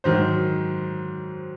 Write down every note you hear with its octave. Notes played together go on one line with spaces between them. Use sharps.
G#2 D#3 F#3 C5